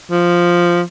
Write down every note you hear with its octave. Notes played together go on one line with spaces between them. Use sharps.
F3